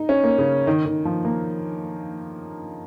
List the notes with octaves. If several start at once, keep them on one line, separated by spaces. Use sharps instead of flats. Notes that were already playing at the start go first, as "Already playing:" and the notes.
Already playing: D#4
C#4
A#3
C#3
D#3
D#3
F3
A#3